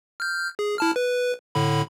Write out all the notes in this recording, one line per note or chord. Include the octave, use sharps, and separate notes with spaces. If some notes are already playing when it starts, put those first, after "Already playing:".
F6 G6
G#4
E4 A5 F6
B4
A2 D3 B5